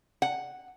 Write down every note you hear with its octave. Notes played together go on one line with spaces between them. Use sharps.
F#5